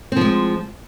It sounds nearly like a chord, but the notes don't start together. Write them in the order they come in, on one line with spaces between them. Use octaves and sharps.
C4 F3 G#3